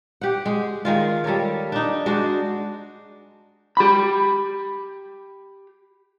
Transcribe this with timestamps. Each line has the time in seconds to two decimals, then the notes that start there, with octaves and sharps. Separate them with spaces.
0.21 G4 F#5
0.46 G#3
0.85 D#3 G#3 F4
1.24 G3 A4 A#4 C#5
1.72 D4 D#4
2.06 G#3 D4 F#4
3.77 G4 B5